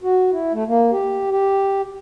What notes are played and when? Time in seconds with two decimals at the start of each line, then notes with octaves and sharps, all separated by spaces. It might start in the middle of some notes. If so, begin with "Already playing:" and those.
0.03 F#4
0.32 E4
0.53 A3
0.68 A#3
0.92 G4
1.31 G4